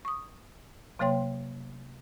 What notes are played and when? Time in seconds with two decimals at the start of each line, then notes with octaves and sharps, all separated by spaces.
0.05 C#6 D#6
0.99 C3 F#3 A#3 C#5 G5 C6